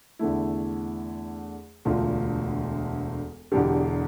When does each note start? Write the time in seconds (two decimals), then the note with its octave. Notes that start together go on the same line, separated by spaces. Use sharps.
0.19 E2 D3 A3 E4
1.85 E1 D2 D3 F4
3.52 E1 E2 D3 G4